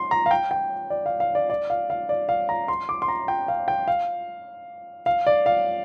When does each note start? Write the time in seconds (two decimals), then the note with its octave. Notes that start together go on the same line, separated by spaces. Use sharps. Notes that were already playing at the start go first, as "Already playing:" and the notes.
Already playing: C6
0.11 A#5
0.26 F5
0.31 G5
0.51 G5
0.90 D5
1.06 F5
1.20 F5
1.35 D5
1.50 D5
1.70 F5
1.90 F5
2.09 D5
2.29 F5
2.49 A#5
2.68 C6
2.89 D6
3.02 C6
3.08 A#5
3.28 G5
3.48 F5
3.68 G5
3.88 F5
5.06 F5
5.27 D5
5.46 F5